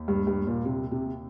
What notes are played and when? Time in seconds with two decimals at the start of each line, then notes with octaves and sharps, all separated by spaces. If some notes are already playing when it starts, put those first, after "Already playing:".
Already playing: D#2
0.08 G2
0.27 G2
0.47 A#2
0.65 C3
0.92 C3